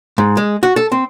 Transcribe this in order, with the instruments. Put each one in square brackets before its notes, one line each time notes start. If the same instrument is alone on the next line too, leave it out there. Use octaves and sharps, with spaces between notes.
[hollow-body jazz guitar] G#2
G#3
F#4
A4
C4